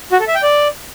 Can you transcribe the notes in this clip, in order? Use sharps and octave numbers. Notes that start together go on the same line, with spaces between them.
F#4
A4
E5
G5
D5